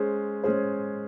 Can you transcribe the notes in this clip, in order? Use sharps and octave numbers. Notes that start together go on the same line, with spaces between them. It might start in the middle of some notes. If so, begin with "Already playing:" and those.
Already playing: G#3 C#4 G#4 C5
G#3 C#4 G#4 C5